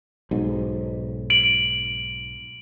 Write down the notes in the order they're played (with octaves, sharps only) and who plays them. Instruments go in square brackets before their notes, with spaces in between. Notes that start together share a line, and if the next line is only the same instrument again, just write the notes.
[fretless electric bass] B1 G#2
[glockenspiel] D7 F#7